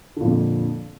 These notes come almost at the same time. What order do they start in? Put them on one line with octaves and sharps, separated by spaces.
D3 A#2 F2